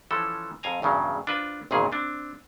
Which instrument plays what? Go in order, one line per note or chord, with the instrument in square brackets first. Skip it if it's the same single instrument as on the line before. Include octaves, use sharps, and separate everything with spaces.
[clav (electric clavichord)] E3 F3 C#4 A4
F2 F5 G#5 A#5
E2 G2 C#3 F#3
D4 F4 B4 C5
G#1 E2 A#2 C#3 G#4
C4 D4